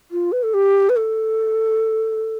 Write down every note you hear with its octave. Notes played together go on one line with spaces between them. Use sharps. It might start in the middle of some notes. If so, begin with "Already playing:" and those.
F4
B4
A4
G4
B4
A4